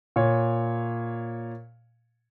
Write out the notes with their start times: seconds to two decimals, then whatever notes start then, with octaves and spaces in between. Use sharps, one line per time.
0.16 A#2 C#5